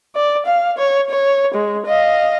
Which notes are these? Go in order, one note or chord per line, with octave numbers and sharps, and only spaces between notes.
D5
F5
C#5
C#5
G#3
D#5 F5